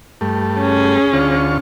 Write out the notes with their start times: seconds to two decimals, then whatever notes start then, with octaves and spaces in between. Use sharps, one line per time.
0.21 G2 A3
0.59 C#4 G#4
1.13 D2 F4 C#6